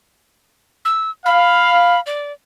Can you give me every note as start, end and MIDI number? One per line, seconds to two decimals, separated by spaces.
0.85 1.10 88
1.26 1.97 77
1.26 2.00 83
2.06 2.32 74